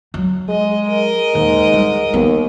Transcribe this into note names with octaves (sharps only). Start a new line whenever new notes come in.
F#3
G#3 D#5
A#4 D#5
D#2 G#2
G3
D#2 B3